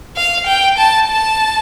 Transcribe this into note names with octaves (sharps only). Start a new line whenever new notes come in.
F5
G5
A5
A5